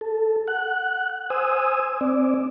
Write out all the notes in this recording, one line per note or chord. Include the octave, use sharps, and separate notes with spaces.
A4
F#5 F#6
C5 G#5 D#6 E6
C4 D5